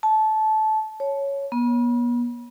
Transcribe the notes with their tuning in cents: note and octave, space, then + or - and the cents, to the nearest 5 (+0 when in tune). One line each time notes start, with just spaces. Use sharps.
A5 -20
C#5 +0
B3 -40